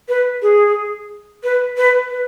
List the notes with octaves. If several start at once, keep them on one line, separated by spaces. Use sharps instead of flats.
B4
G#4
B4
B4
B4